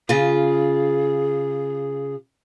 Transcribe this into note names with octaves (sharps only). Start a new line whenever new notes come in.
C#3 F4 G#4